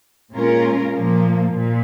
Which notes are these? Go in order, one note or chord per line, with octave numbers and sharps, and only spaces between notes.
A#2 G#3 C#4 F4 A#4
A#2 F3 A#3
A#2